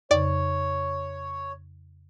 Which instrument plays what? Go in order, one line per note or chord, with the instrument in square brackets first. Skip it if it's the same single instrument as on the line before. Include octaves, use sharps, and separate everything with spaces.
[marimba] F2 C#3 [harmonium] C#5 [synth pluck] D5